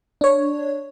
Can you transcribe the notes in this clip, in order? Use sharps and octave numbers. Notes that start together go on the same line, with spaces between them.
D4 C#5